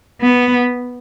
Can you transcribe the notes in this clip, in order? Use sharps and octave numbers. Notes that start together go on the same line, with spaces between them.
B3